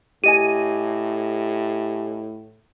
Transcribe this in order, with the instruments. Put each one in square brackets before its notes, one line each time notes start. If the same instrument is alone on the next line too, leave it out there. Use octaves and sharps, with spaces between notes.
[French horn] A2 [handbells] G4 D#5 G#5 [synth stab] D#7